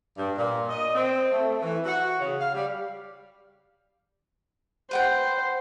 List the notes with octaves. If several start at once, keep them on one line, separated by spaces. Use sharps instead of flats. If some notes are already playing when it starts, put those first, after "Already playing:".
G2
A#2
D#5
C4
A3
E3
F#4
C#3
F5
G3
B4 C5 F#5 G5